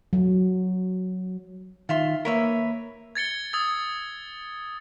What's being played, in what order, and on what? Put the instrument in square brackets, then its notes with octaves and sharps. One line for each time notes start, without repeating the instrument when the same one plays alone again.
[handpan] F#3
[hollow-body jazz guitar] D#3 [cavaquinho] F4 E5 C6
[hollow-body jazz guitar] A#3 A#4 [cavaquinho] B4 C#5 E5
[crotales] G#6 A6 C#7 G7
D#6 E6 G#6 A6